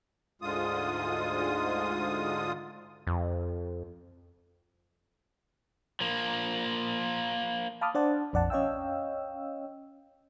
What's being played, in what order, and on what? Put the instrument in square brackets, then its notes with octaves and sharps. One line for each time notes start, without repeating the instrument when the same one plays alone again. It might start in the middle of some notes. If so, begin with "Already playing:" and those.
[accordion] D2 G#2 D3 G#3 F4 D#6
[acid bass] F2
[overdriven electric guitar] F3 A#3
[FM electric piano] F5 A5 B5 D6 D#6 F6
D4 C5 D5 F#5 A5
A#1 F2 D5 F#5 A5
C#4 C#5 D#5 F5 G5 E6